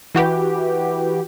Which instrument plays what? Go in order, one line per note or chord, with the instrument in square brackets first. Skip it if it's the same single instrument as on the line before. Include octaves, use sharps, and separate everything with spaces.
[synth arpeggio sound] E3 F#4 G4 B4